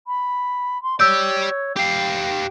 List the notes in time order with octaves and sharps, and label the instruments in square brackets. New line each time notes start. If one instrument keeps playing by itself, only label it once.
[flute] B5
C6
[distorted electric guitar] G4 D5 [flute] C#5 [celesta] E6 G6
[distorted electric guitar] G4 F5 [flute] G5